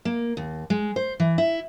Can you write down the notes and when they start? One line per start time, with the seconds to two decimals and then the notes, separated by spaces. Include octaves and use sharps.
0.05 A#3
0.37 D#2
0.70 G#3
0.96 C5
1.20 E3
1.38 E4